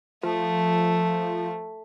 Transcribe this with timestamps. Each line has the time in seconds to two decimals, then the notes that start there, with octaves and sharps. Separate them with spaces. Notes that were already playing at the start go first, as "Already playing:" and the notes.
0.23 F3 A3